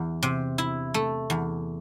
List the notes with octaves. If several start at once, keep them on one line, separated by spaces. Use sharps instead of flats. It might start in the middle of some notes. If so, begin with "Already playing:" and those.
Already playing: E2
C3
E4
A3
E2